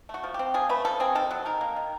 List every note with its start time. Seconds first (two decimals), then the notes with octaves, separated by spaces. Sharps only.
0.09 A3
0.14 F#4
0.23 F3
0.34 C4 G4
0.54 F3 G#4
0.69 A3 B4
0.85 F3 A4
1.00 C4 G#4
1.15 D#3 A4
1.31 F#3
1.45 D#3 A#4
1.61 A#3
1.76 D#3